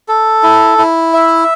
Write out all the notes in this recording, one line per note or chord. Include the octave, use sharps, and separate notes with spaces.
A4
E4
E4
E5